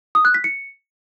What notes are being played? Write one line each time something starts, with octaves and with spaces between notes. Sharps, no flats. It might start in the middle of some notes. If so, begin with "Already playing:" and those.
D#6
F#6
B6
C#7